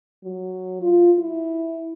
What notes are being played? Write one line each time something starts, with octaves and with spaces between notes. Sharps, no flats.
F#3
F4
E4